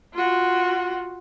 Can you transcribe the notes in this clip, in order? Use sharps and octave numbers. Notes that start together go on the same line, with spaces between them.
F4 F#4